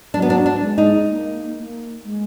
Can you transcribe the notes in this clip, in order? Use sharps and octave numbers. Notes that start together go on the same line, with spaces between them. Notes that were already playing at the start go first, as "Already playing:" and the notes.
F#3 D4
B3
D4
D4
G#3
D#4
A#3
A#3
G#3